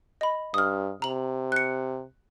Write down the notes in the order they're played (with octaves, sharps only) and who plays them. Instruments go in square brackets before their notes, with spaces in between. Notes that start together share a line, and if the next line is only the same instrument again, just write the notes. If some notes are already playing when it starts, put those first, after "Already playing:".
[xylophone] D#5 B5
[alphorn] G2 [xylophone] D#6 F6
[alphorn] C3 [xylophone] A#5 F#7
[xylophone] F#6 C#7